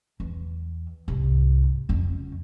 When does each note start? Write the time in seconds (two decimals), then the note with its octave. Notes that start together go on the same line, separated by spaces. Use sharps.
0.20 E2
1.08 C2 G#2
1.89 F2 C#3